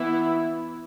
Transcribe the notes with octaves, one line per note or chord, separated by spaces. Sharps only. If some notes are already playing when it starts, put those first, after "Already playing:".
Already playing: E3 B3 E4